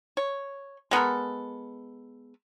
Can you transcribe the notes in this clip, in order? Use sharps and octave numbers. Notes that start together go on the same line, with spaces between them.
C#5
G#3 B3 A4 A#4